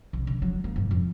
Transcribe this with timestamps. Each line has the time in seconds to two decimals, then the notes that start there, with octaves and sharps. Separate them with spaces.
0.13 B1
0.27 D3
0.42 F#3
0.64 A#3
0.76 G#2
0.91 F2